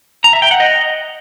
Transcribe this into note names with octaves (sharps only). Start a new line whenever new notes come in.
A#5
E5
G5
F#5
D#5